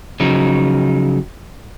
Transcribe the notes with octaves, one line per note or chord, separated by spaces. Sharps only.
C#3 F3 F#3 D#4